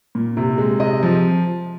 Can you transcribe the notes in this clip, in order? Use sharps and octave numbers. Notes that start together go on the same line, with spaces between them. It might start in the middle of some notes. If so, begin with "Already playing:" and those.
A#2
C3
G#3
C3 D#5
F3